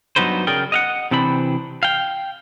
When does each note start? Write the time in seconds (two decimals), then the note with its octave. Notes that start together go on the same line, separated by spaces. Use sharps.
0.16 G2 F#3 B3 D#4 B4 C5
0.47 C#3 G#4 A#4 D5 G5
0.72 D#5 F5 F#5
1.11 C3 E3 C4 D4 B5
1.83 F5 G5